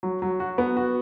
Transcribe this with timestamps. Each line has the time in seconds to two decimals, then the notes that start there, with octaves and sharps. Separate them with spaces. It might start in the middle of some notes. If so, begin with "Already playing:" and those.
0.03 F#3
0.22 F#3
0.40 F#4
0.58 B3
0.77 F#4